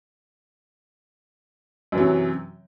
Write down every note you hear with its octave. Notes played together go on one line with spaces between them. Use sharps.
F#2 C3 E3 F#3